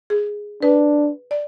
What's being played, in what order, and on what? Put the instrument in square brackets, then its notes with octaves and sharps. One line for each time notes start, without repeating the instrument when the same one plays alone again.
[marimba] G#4
[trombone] D4 [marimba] B4
[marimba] D5